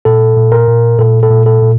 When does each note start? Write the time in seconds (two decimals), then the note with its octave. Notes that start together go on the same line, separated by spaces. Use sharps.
0.05 A#2 A4
0.37 A#2
0.52 A#4
0.67 A#2
0.99 A#2 A4
1.23 A4
1.30 A#2
1.46 A4
1.62 A#2